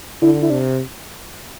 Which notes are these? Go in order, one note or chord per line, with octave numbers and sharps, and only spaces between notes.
D3 E4
E4
C3 D4